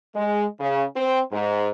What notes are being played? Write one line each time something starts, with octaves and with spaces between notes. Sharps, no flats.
G#3
C#3
C4
G#2